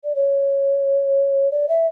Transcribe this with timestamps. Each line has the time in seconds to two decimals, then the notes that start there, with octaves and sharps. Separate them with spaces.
0.04 D5
0.16 C#5
1.51 D5
1.69 E5